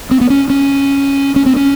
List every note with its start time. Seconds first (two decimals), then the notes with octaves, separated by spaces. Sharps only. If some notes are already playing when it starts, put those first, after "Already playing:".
0.11 C4
0.21 B3
0.30 C#4
0.50 C#4
1.36 C#4
1.46 C4
1.56 C#4